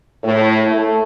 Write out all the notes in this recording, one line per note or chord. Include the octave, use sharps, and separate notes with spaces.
A2
A3